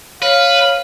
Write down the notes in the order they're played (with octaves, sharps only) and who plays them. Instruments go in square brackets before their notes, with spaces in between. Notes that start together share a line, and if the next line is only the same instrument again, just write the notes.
[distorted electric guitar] B4 [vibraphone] C#5 [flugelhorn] F5